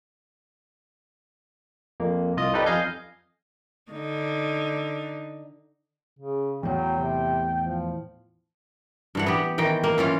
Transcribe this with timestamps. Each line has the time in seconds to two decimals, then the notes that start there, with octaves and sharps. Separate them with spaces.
2.00 F2 A#3
2.37 C2 F4 D#5
2.54 D#4 G4 A4 B4 D5
2.66 F2 D#5 F5 G#5 G6
3.92 D3 D#4
6.19 C#3
6.63 E2 A2 F#3 G5
6.98 C3
7.61 F3
9.15 G2 E3 F#5
9.26 B3 G4
9.58 D#3 E3 G5
9.84 A#3
9.98 E3 C#4 F4